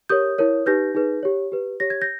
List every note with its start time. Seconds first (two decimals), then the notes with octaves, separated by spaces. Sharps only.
0.09 G4 A#4 C#5 D#6 G6
0.38 E4 A#4 C#5
0.66 D#4 G4 B4 G6 A#6
0.95 D#4 G#4 B4
1.23 G4 C#5
1.52 G4 B4
1.80 G4 C#5 A#6
1.90 G#6
2.01 G6 A#6